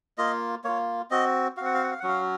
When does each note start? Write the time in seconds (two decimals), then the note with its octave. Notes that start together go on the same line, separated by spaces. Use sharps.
0.18 A#3 F4 D#5
0.64 A#3 F4 C#5
1.11 C4 F#4 D#5
1.57 F#4 F5
1.61 C4 F#5
1.74 F5
1.83 F#5
1.91 F5
2.00 F#5
2.03 F#3 C#4 F#4 F5